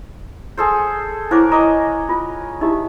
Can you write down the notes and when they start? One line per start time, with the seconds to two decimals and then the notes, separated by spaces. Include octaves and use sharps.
0.57 G#4 A4 C5
1.31 E4 A#4 C5 C#5 F#5 D6
1.52 D#5 A#5 D6
2.09 F4
2.61 D#4 E4 G4 E5